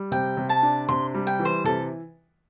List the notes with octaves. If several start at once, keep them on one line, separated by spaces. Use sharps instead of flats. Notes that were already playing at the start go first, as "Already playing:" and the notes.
Already playing: G3
C3 G5
C3
A5
D4
C3 C6
G3
G5
E3
C5
C3 A4